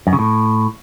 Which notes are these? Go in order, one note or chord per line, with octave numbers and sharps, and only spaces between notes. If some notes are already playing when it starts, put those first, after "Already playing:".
F#2
C#3
A2